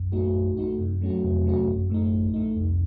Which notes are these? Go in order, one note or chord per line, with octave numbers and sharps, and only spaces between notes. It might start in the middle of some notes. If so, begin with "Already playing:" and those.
Already playing: A#1 F#2
A2 A3 D#4 F#4
A#1
A2 A3 D#4 F#4
F#2 C3
F#3 A3 C#4 F#4
F2 C3
F#3 A3 C#4 F#4
A1 F#2
A2 A3 D#4
A1
A2 A3 D#4
C2 F2